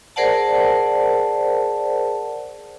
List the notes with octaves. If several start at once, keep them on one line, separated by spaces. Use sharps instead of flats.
G#4 A#4 C5 D5 F#5 A5